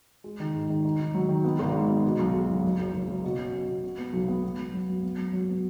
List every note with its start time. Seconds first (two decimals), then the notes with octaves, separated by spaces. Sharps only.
0.24 G#3
0.40 D#3
0.54 G#2
0.70 D#3
0.85 D#3
1.00 D#3
1.14 F#3
1.29 D#3
1.44 B3
1.59 G#1
1.75 G#2
1.90 B3
2.05 B2
2.19 B1
2.34 G#3
2.49 B1
2.64 F#1
2.79 F#1
2.94 F#1
3.08 F#2
3.24 B2
3.39 C#4
3.54 B2
3.69 B2
3.84 F#4
3.98 B3
4.13 B1
4.28 B3
4.43 B3
4.58 F#3
4.73 F#2
4.89 F#3
5.03 B3
5.18 F#2
5.33 F#3
5.49 B3